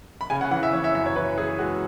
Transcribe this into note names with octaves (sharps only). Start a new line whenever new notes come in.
B5
C#3 G#5
F#5
E3 F#5
E5
E3 C#5
E5
F#2 E5
C#5
E3 B4
E3 G#4
G#3 F#4